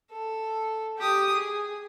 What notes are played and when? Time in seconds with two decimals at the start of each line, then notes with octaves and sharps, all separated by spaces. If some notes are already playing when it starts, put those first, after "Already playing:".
0.11 A4
0.98 G4 D#6
1.32 G#4